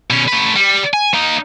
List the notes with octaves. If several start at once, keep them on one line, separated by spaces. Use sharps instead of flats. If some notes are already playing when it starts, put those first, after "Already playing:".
B2 C#4
A3 B4
G3
G#5
A#3 D#4